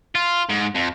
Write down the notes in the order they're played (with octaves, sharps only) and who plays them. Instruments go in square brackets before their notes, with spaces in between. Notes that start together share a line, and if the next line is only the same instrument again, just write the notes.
[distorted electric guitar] F4
G#2
F2